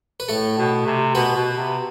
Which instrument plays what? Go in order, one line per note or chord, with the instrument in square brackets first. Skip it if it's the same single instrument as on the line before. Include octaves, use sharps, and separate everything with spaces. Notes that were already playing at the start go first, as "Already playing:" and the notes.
[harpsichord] B4
[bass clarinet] A2 [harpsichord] A3 A4
[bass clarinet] B2
C3
[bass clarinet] B2 [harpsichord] B3 B4
[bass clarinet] B2
C3